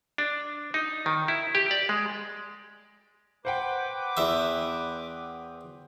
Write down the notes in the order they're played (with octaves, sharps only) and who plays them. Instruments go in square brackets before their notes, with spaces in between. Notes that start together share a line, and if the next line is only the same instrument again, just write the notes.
[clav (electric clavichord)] D4
D#4
D#3
E4
G4
D5
G#3
[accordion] B4 D6 [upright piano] C5 F#5 G5
[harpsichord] E2 E5